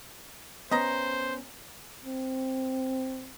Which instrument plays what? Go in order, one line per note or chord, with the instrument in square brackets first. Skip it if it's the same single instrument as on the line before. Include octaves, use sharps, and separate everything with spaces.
[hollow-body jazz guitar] B3 C#4 [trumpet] C5 [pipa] D#5 A#5
[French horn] C4